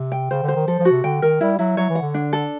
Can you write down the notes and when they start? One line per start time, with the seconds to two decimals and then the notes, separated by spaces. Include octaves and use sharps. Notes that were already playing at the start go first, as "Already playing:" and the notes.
Already playing: C3
0.12 G5
0.31 C#3 C5
0.43 D3
0.48 C5
0.55 D#3
0.67 F3 A4
0.79 F3
0.85 F#4
0.91 C3
1.04 D3 G5
1.22 D#3 A#4
1.41 G3 E4
1.59 F#3 E4
1.77 F#3 C#5
1.90 E3
1.95 F#5
2.02 D3
2.14 D4
2.33 A4